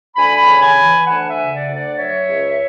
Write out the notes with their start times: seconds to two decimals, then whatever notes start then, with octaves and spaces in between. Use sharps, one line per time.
0.16 D2 G#5 B5
0.47 C#3
0.61 G#5 B5
0.76 E3
1.07 D2 F#5 A5
1.29 E5 G#5
1.37 C#3
1.52 D5 F#5
1.68 D2
1.74 D5 F#5
1.97 F#3 C#5 E5
2.27 C#2